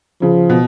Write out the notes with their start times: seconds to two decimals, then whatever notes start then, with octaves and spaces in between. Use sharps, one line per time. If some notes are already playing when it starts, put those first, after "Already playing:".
0.22 C#3 F3
0.50 B2